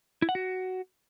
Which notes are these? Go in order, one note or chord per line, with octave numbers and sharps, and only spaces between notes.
E4
F#5
F#4